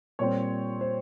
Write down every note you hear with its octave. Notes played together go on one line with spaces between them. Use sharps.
A#2 G3 C4 C#5
C5